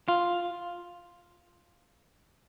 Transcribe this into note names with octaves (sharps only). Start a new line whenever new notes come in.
F4